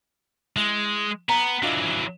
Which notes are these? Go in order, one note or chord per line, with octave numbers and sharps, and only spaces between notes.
G#3 E4
B3 B4 A#5
E3 F#3 D4 F4 D#5